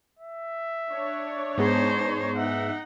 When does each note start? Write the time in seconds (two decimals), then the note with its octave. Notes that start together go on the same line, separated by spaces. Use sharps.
0.19 E5
0.92 D4 C#5
1.57 G#2 B3 D#4 G#4 C5
2.37 D#4 E5 F#5